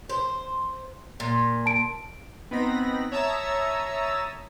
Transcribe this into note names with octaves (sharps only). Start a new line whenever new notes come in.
C5
A#2
A5 D7
B3 C4 D#4 B5 A#6
C#5 E5 A5 A#5 D#6 E6